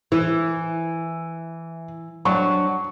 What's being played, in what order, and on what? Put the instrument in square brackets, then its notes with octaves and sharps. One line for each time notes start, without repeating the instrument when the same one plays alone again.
[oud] E3 [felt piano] E4
[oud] F#3 D4 [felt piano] C#6